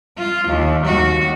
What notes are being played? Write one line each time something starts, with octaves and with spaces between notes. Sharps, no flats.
F4
D#2
D#2 F#4